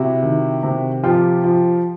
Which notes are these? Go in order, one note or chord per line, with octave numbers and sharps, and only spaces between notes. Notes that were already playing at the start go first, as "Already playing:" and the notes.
Already playing: C3 E4 F#4
D#3
C3
F3 F4 G4
F3